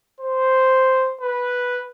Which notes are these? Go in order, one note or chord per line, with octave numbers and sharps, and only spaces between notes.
C5
B4